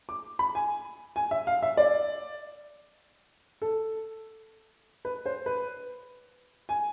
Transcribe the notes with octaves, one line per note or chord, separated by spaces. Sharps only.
D6
B5
G#5
G#5
E5
F5
E5
D5
A4
B4
C5
B4
G#5